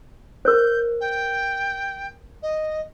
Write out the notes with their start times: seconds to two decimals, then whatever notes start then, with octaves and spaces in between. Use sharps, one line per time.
0.45 A#4 C5 G6
1.00 G5
2.42 D#5